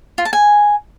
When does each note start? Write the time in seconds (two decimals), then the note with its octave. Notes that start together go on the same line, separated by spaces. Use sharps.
0.18 F4
0.25 A5
0.33 G#5